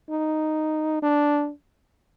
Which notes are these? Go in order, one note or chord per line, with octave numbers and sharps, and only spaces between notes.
D#4
D4